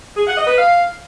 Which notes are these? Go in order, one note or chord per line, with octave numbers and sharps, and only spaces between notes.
G#4
F#5
D#5
B4
F5